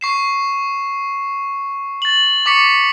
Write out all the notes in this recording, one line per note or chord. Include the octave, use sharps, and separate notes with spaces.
C#6 C7 E7
A6 F#7
C#6 D6 B6 C#7